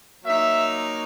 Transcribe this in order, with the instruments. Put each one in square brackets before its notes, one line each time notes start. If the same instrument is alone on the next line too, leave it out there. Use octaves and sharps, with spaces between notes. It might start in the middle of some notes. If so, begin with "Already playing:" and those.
[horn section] F#3 A#3 D#4 E5